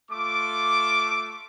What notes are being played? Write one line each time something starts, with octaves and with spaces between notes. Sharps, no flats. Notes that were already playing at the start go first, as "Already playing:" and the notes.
A3 F4 D6